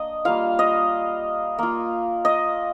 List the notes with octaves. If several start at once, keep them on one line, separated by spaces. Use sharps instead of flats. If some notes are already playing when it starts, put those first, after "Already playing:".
Already playing: A#3 D4 D#5
G3 A#3 F4 F5
D#5
A#3 F4
D#5